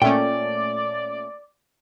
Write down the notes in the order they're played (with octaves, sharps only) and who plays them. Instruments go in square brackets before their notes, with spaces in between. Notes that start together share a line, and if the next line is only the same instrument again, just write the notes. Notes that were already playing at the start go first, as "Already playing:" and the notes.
[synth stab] A#2 A3 C#4 [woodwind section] D5 [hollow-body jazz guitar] G5